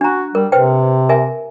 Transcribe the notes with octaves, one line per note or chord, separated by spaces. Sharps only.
D4 F#4 A#5
G3 A#4
C3 B4 C5 G5
A#4 E5 G#5